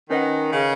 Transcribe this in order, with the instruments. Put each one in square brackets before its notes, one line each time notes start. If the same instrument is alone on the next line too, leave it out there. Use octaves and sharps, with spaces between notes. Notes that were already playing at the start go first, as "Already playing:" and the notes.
[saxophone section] D#3 [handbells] C#4 B4 D#5 F#5
[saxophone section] C#3